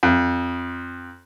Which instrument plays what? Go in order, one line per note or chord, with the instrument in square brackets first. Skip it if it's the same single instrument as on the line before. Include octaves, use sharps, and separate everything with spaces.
[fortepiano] F2